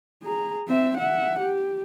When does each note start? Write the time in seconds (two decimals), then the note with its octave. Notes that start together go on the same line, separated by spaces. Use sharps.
0.23 G#4 A#5
0.68 C4 E5
0.97 E5 F#5
1.39 G4